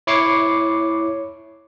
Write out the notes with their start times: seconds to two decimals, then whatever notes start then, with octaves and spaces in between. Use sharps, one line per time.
0.07 E4 C#5 D6 C7 C#7